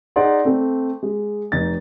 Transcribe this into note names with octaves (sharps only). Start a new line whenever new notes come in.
D#4 G#4 D5 F#5 C6
A3 C4
G#3
F1 D#4 A6